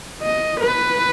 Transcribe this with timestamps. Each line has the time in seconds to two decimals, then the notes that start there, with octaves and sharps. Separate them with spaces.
0.22 D#5
0.61 B4